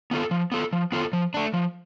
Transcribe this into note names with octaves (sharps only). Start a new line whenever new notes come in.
B3 F4 A4
F3
B3 F4 A4
F3
B3 F4 A4
F3
A3 D4
F3